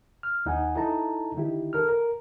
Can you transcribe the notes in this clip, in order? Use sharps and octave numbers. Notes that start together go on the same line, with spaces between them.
F6
D#2 D#4 F#5 G#5
D#4 E4 A4 A5 A#5
D3 D#3 D#4 E4 G4
A4 A#4 F6
A#4